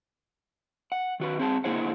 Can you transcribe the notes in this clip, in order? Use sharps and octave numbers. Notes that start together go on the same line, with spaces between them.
F#5
D#3 F#4 B4
C4 G#4 A5
D3 A#3 E4 G#4 C5 F#5